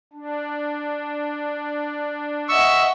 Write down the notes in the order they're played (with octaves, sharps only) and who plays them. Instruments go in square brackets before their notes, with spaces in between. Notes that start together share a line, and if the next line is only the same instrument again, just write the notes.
[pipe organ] D4
[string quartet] D#5 E5 F#5 [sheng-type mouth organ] C#6 E6